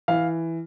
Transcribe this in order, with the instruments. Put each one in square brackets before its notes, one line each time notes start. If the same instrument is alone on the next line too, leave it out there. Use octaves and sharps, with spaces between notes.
[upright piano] E3 F5